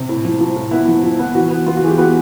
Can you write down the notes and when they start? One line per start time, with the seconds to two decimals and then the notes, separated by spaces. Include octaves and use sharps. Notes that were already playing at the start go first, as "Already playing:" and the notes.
Already playing: C3
0.09 A2
0.25 F3
0.40 F3
0.56 A2
0.71 B3 E4
0.88 F3
1.03 F3
1.19 B3
1.35 E3 F#4
1.50 B3
1.66 B3 F4
1.77 F#4
1.83 E3 G#4
1.88 G4
1.98 B3 F#4